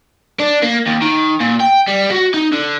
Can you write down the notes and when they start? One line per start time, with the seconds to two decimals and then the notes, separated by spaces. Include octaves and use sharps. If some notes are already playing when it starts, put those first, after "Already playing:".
0.39 D4
0.62 A#3
0.86 D#2
1.02 D#3
1.41 A#2
1.60 G5
1.88 G3
2.11 F#4
2.34 D#4
2.53 D3